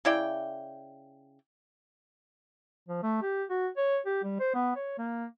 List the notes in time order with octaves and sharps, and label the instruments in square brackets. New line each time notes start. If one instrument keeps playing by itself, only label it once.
[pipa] C#3 E4 D5 G5
[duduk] F3
A3
G4
F#4
C#5
G4
G3
C5
B3
C#5
A#3